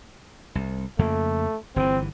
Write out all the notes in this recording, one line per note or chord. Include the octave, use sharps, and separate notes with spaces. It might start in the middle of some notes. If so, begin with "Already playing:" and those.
C2
F2 C#3 A3 A#3
G1 C3 E3 C4